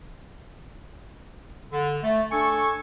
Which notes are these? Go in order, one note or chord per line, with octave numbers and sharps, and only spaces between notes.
D3
A3
D4 A4 G#5 C#6